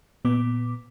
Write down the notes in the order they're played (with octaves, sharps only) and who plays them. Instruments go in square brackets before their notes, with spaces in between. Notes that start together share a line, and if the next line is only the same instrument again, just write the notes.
[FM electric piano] A#2 B3 D6